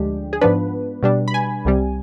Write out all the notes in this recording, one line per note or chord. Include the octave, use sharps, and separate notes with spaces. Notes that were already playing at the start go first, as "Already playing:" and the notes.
Already playing: D2 D3 F3 G#3 D4 G4
G#4
G#2 F3 B3 D4 B4
B2 G3 D4
B5
G#5
C2 C3 G3